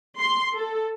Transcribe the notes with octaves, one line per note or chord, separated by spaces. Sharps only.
C6
A4